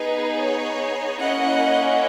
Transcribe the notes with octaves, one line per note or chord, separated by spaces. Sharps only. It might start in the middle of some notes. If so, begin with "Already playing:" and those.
Already playing: B3 D#4 G#4 B4
C#5
A#3 C#4 E4 D#5 F#5